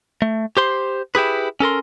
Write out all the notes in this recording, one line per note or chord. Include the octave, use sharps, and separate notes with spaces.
A3
G4 C5 C6
E4 G4 G#4 B4
C#4 A4 A#4 C6